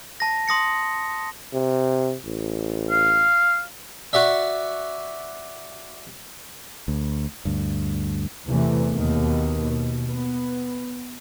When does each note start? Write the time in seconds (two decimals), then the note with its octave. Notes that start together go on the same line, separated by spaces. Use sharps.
0.20 A5 A#6
0.48 C6 D#6 A#6 C#7
1.54 C3
2.25 A1
2.90 F5
4.13 F#4 D5 E5
6.88 D2
7.45 D2 G2
8.47 E2 C3 E3 A3
8.92 D#2 B2 D#3
9.62 B2
10.09 B3